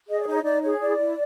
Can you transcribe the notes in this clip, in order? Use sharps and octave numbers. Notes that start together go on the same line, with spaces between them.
G#4 D#5
D5
D#4
C#5
D#4 D5
G#4 C#5
E4 D5
E4